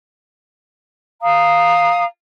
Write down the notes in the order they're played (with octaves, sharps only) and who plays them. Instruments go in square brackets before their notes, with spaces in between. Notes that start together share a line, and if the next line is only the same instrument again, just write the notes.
[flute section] F5 A#5 D#6